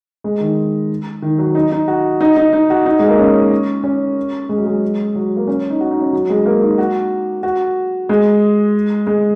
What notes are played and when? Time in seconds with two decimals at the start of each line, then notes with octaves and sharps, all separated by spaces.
0.24 G#3
0.40 D#3
1.22 D#3
1.38 F#3
1.55 D#4
1.72 D#4
1.88 F#4
2.21 D#4
2.36 D#4
2.53 D#4
2.70 F#4
2.86 D#4
2.99 G#3
3.08 A#3
3.19 C#4
3.83 C#4
4.49 G#3
4.58 F#3
4.66 G#3
5.15 F#3
5.36 A#3
5.47 C#4
5.70 D#4
5.81 F#4
5.91 D#4
6.01 C#4
6.13 F#3
6.30 G#3
6.46 A#3
6.62 D#4
6.78 F#4
7.43 F#4
8.09 G#3
9.07 G#3